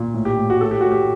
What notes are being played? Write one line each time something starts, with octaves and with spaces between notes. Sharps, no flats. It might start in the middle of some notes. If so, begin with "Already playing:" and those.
Already playing: A#2
A2
G4
A2
F#4
A2 A4
G4
A2 F#4
G4